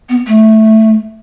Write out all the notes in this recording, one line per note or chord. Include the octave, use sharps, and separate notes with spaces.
B3
A3